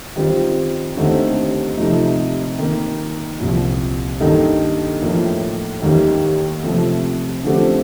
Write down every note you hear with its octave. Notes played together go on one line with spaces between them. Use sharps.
D#3 G3 C4 F4
D#2 D3 A3 C4 D#4
C3 F3 A3 D#4
D#3 A#3 D#4
C2 A#2 F3
G2 D#3 A#3 D#4 A4
A2 F3 A#3
D#2 D#3 G3 A#3 D#4
C3 F3 A3
D3 F3 A3 C4 G4